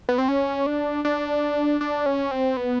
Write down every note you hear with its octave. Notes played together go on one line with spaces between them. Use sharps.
B3
C4
C#4
D4
D4
D4
C#4
C4
B3